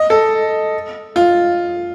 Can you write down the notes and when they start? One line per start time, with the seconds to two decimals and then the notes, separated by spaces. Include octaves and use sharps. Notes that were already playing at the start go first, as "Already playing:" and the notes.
Already playing: D#5
0.10 A4
1.16 F4